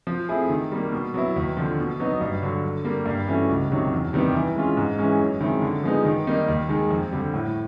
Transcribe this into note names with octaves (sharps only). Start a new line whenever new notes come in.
F3
A3 C4 E4 G#4
D#3
G3 A#3
B2
F#3 B3 E4
D#2
D3 F3
B2
F#3 B3 D#4
G2
D3 F#3
D3
G3 A#3
G2
E3 A3 C#4 F#4
C#2
C3 D#3 F#3
E2
C3 D#3 G3 B3
E3
G#3 C#4 F4
G#2
E3 G#3 C#4
F#2
D#3 G#3 C4 E4
D3
F3 G#3 B3 D#4
D#3
G3 A#3 D#4
D#2
D#3 G#3
F2
D3 G3
A2